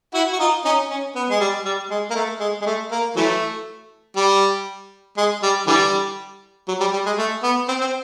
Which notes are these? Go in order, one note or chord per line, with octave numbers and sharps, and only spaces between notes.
E4 F#4
F#4
D#4 F4
C#4 D#4
C#4
B3
G#3
G3
G3
G#3
A#3
A3
G#3
G#3
A3
A#3
E3 F#3 A3
G3
G#3
G3
D3 E3 G3
F#3
G3
G3
G#3
A3
B3
C4
C4